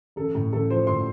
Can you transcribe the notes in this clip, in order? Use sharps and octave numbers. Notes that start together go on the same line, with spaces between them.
A1 A4
A2
A1 A4
F3 C5
A2 C6